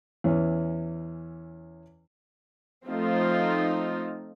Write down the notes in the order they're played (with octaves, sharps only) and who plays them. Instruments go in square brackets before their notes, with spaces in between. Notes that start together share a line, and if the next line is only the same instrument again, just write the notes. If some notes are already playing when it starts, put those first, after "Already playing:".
[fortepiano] E2 E3 C#4
[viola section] F3 A3 C4 D#4 F4